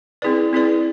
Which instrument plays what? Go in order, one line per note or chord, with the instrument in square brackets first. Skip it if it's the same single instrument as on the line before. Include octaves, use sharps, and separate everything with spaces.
[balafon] C4 E4 G#4 B4 D5
C4 E4 G#4 B4 D5